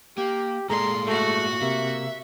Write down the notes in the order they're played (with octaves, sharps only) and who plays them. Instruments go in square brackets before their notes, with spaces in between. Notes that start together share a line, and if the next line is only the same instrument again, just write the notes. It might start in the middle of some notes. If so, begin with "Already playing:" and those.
[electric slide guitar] A#3 [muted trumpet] G4
[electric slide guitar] A2 A#3 D5 [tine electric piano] G#3 G#4 A4 [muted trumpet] A#5 [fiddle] C6
[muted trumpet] A3 [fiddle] F#4 F#5
[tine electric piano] C3 [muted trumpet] A#3 [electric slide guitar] E5